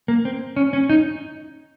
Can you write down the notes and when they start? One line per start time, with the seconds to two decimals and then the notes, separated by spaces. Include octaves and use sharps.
0.08 A#3
0.25 C4
0.56 C#4
0.73 C#4
0.89 D#4